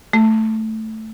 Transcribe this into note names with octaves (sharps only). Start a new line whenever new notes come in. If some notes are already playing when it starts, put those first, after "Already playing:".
A3